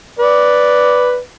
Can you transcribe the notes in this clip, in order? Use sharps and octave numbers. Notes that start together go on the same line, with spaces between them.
B4 D5